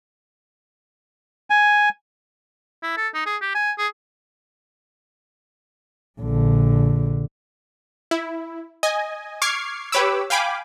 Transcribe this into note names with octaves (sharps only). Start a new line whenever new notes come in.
G#5
E4
A4
D#4
G#4
G4
G#5
G#4
A#1 D3
E4
D#5 G#5
C#6 D6 F6 G#6 C7
G4 B4 C#5 B5 D6 E6
F5 G5 G#5 B5 D6